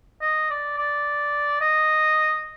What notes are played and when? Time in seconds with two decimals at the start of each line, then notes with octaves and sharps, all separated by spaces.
0.22 D#5
0.51 D5
0.78 D5
1.61 D#5